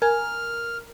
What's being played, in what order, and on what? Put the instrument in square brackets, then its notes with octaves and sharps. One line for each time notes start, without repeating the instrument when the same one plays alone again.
[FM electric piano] A#4 [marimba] G#5 G#6 [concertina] F6